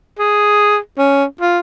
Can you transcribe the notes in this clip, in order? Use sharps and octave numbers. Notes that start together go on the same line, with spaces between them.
G#4
C#4
F4